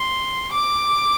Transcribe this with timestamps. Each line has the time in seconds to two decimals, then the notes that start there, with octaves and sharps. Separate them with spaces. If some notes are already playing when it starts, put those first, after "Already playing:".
Already playing: C6
0.53 D6